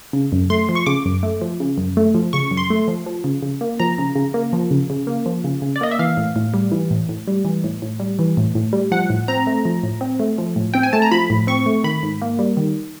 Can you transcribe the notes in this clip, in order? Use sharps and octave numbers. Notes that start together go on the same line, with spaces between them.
C#3
F#2
A3 C6
F3
C#6
C#3 D6
F#2
A3
F3
C#3
F#2
A3
F3
C#3 C#6
F#2
C6
A3
F3
F3
C#3
C#3
A#3
F3 A#5
C#3
C#3
A#3
F3
C#3
C#3
A#3
F3
C#3
C#3
D5
A#3 D#5
E5
E3 F5
A2
A2
G3
E3
A2
A2
G3
E3
A2
A2
G3
E3
A2
A2
G3
F3 F#5
A2
C4 A#5
A3
F3
A2
C4
A3
F3
A2
C4 G5
G#5
A3 A5
A#5
F3 B5
A2
C4 C#6
A3
D#3 B5
G#2
A#3
G3
D#3